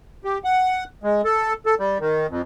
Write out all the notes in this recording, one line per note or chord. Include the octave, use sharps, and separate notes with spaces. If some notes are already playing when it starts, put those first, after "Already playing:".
G4
F#5
G#3
A4
A4
G3
D#3
F2